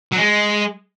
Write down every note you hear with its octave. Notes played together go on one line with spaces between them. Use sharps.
F#3
G#3